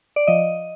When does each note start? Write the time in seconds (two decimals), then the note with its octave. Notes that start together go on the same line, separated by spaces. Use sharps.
0.16 D5
0.27 F3 D#5